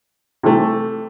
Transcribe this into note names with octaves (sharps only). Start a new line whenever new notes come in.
C3 E3 A3